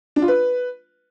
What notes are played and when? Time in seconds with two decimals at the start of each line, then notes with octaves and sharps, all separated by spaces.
0.16 D4
0.22 F4
0.28 B4